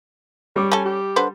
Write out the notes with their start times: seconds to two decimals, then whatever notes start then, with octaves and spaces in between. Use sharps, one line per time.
0.56 G3 C#5 D6
0.72 C#4 A4 G#5
0.85 G4
1.16 D3 B4 C5